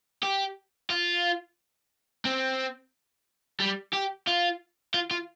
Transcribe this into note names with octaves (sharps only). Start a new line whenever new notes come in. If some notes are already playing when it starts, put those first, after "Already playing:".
G4
F4
C4
G3
G4
F4
F4
F4